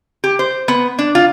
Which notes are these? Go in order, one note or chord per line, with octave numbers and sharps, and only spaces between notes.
G4
C5
B3
D4
F4